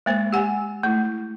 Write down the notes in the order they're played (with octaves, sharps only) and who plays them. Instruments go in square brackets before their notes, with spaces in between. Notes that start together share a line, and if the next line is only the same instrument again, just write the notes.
[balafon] G#3 A#3 C5
G4 F#5 G#5
A3 E4